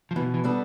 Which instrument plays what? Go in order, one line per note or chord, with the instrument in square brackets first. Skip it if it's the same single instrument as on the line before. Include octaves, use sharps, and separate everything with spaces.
[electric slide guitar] F3
[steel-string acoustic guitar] B2 [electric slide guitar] E3
[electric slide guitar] E3
[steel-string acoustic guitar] G3 B3 D4 A4